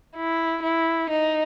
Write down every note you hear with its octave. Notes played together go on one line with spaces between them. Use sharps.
E4
E4
D#4